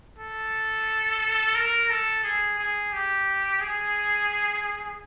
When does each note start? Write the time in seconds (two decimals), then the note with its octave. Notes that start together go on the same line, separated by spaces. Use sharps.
0.18 A4
1.55 A#4
1.90 A4
2.24 G#4
2.59 G#4
2.93 G4
3.61 G#4